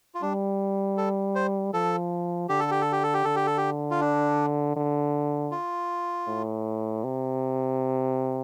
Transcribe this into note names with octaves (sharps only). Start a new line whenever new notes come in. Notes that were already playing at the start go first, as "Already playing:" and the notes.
F4
G3 D4
A4
C5
F3 A4
D3 G4
A4
G4
A4
G4
A4
G4
D3 A4
G4
A4
G4
F4
D4
D3
F4
A2
C3